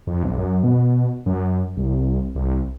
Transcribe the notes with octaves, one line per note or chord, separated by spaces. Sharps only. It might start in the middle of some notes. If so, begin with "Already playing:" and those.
F2
B1
F#2
B2
F#2
C2
C2